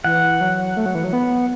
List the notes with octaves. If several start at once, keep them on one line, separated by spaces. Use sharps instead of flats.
E3 F#5
F#3
A3
F#3
E3
F#3
B3